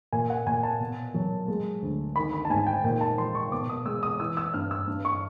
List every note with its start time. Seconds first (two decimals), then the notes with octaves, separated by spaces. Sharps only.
0.13 A#2 G#5
0.30 F#5
0.46 A#2 G#5
0.63 A5
0.80 B2
1.14 F#3
1.48 G#3
1.82 D2
2.16 D#3 B5
2.33 B5
2.45 A5
2.50 G#2 G#5
2.67 G5
2.84 A#2 G5
3.01 A5
3.18 F3 C6
3.35 C#6
3.52 B2 D6
3.69 D#6
3.85 G#3 E6
4.03 D#6
4.20 E3 E6
4.37 E6
4.54 G2 F6
4.71 E6
4.88 G2
5.05 C#6